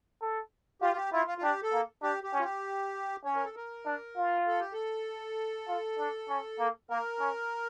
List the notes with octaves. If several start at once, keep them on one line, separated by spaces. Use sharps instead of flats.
A4
F4 G4
F4
G4
E4 F4
F4
F4
D4 G4
A4
A#3
D4 G4
G4
C#4
F4
G4
C#4 C#5
A#4
A4
A#4
D4
F4
A4
G4
A4
F4
D4
C#4
A#3
A#3 A#4
C#4